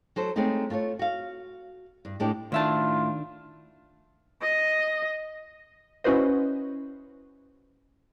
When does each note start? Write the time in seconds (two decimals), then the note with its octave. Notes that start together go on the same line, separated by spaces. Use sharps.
0.16 F#3 A4 C5
0.36 G#3 A3 C4 C#4 D#4
0.70 A3 F4 A4 C#5
0.99 F#4 F5
2.05 G2
2.20 A2 G#3 D4 G4
2.52 A2 D#3 D4 F4 E5 A5
4.42 D#5
6.04 C#4 E4 F#4 B4 C5 D#5